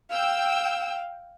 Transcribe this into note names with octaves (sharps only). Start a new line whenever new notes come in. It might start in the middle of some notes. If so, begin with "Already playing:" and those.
F5 G5 E6